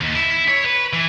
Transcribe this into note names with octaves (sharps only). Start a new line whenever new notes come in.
D#2
E4
E4
C#5
B4
E3